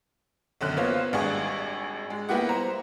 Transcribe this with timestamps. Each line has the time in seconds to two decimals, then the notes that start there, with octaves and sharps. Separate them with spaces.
0.61 B1 F#2 D3 F#6
0.77 A#3 B3 F4 C5 C#5 F5
1.13 G#1 G3 D4 G#4 C#6
2.10 G#3
2.29 G3 A#3 B3 E4 G4 F#5
2.49 C5 A#5